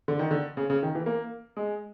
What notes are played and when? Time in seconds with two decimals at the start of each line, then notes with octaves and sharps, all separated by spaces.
0.08 D3
0.19 D#3
0.31 D3
0.57 C#3
0.70 C#3
0.83 D#3
0.95 E3
1.06 A#3
1.57 G#3